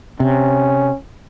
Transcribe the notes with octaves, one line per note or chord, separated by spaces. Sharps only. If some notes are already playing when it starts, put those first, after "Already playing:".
C3 C#4